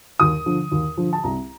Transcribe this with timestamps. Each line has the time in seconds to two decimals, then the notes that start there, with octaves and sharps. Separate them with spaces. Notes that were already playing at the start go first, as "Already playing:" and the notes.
0.19 D#2 D#6
0.46 D3 F3
0.72 D#2
0.97 D3 F3
1.13 A5
1.24 C2 A#5